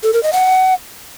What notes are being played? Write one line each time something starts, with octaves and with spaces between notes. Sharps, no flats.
A4
A#4
D#5
F#5